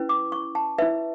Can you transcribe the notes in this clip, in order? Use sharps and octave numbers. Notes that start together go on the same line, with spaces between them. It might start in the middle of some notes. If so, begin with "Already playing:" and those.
Already playing: C#4 E4 B4
D6
C#6
A5
E4 B4 E5